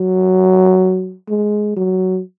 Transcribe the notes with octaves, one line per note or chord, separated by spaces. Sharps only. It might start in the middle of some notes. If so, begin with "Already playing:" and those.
Already playing: F#3
G#3
F#3